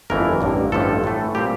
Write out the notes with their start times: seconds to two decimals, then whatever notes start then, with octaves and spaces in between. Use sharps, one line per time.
0.10 G1 F2 E3 A3 A#4
0.41 A1 G2 D3
0.72 A1 G2 D3 F3 A3 A4
1.04 A2 E3 A3
1.35 A#2 G3 C4 G4